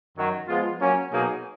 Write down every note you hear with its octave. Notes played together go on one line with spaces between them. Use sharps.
F#2 D#3 F#3
F3 G#3 B3 F4
F#3 A#3 C#4
B2 F#3 A#3 D#4 G#4